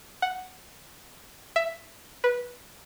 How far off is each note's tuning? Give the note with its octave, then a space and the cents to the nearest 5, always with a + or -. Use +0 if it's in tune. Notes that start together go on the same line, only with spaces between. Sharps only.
F#5 +0
E5 +10
B4 -15